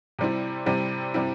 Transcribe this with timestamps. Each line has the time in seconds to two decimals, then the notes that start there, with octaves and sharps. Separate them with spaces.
0.19 C3 G3 C4 E4
0.66 C3 G3 C4 E4
1.14 C3 G3 C4 E4